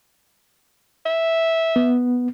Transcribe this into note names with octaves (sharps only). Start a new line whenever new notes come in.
E5
B3